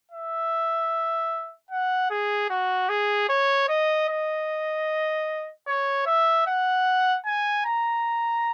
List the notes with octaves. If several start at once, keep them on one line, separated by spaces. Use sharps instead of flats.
E5
F#5
G#4
F#4
G#4
C#5
D#5
D#5
C#5
E5
F#5
G#5
A#5